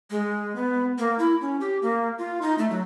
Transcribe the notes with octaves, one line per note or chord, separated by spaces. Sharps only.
G#3
B3
A#3
E4
C#4
G4
A#3
F4
D#4
A3
F#3